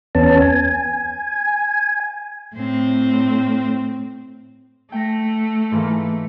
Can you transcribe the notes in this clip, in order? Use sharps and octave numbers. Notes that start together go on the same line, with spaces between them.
E2 B3 C#4 A5
G#5
A2 C4
A3 G5 A#6
G#2 E3 A#3